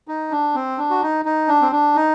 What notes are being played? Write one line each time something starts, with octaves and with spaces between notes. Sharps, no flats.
D#4
D4
C4
D4
F#4
D#4
D#4
D4
C4
D4
D#4